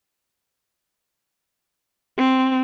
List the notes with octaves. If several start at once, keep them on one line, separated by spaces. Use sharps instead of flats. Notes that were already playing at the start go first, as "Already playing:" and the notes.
C4